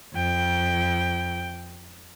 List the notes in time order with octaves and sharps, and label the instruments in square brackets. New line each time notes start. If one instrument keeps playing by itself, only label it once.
[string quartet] F2 G5